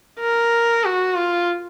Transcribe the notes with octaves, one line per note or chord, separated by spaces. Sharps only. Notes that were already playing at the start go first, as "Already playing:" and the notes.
A#4
F#4
F4